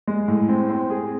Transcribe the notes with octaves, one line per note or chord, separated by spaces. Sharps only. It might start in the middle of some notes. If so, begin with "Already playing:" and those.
G#3
A2
C4
C4
G#4